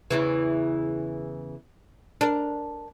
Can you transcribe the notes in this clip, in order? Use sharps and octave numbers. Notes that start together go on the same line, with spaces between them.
E2 C#3 E3
D4 A#4